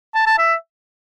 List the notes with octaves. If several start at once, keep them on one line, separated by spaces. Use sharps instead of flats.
A5
A5
E5